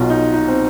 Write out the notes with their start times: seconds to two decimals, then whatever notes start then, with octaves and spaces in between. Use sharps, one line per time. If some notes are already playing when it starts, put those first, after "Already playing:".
Already playing: B1 B2 F4
0.10 D#4
0.34 D#4
0.48 C4